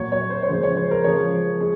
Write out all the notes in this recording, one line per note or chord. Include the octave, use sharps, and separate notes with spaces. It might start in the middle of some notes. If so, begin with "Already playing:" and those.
Already playing: A#2 F#3 C#5
C#5
C5
C#5
C#3 F3 G#3 C5
C#5
C5
A#4
C#3 F3 G#3 C#5
G#3